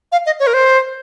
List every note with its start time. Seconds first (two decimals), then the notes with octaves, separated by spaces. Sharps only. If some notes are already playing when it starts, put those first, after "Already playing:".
0.12 F5
0.26 D#5
0.40 C#5
0.47 A#4
0.54 C5